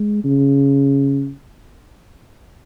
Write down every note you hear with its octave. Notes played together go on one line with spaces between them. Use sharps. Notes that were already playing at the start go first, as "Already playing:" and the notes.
Already playing: G#3
C#3